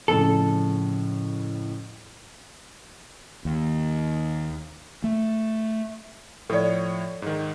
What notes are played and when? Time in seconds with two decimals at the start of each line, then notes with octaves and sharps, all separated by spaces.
0.08 F2 A2 C#3 A4
3.45 D#2
5.04 A3
6.50 A2 F3 A4 C#5 D5
7.22 G#2 D#3